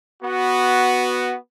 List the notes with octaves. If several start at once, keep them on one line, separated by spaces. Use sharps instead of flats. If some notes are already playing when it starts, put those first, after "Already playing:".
B3 F#4